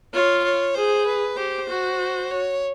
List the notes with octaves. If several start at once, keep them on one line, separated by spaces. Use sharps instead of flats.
F4 C#5
C#5
G#4 C5
B4
G4 C5
F#4
C#5